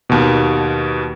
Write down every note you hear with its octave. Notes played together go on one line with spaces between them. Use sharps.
D#2 B2